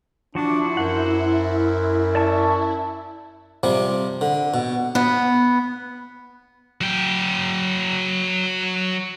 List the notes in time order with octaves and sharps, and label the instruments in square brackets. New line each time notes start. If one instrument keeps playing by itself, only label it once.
[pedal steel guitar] F3 F#4 D6 [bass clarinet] D4 [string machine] E4
[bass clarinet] F#2 [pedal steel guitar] C5 F#5
[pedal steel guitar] D5 A5 C#6
[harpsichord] C3 F3 G3
D3
B2
[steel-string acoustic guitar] B3
[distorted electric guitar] F#3 G5